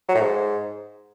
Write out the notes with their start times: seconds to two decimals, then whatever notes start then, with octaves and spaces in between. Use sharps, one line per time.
0.09 F#3
0.15 A2
0.21 G#2